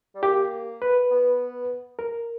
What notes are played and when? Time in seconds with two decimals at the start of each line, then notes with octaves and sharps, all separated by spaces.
0.15 G3
0.23 A#3 G4
0.82 B4
1.11 B3
1.99 A#4